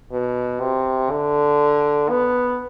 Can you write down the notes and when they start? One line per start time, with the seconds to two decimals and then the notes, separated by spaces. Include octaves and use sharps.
0.12 B2
0.60 C3
1.10 D3
2.10 B3